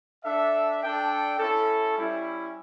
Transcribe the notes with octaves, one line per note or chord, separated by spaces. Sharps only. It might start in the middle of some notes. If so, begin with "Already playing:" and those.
D4 A4 E5
D4 A4 D5 G5
C#4 E4 A4
G3 C#4 E4